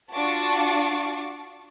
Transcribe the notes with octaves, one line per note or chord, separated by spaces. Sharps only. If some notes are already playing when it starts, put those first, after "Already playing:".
D4 F4 F#4 A5 C#6 D6